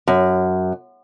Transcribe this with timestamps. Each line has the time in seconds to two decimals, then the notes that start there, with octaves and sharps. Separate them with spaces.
0.08 F#2